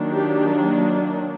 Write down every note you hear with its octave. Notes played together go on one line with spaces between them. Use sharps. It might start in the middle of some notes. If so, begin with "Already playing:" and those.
Already playing: D#3 F#3 A#3 D4
G4